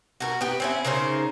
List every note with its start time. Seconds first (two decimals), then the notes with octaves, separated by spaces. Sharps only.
0.20 F#4 A4 A#4
0.41 B3 G4
0.60 C4 C#4 E4
0.85 C#3 D#4 A#4 C5